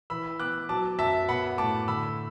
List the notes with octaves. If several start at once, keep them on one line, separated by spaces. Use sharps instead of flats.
E3 B5 E6
B3 D6 F#6
F#3 A5 D6
F#2 E5 A5
B3 F#5 B5
A2 A5 D6
D3 B5 E6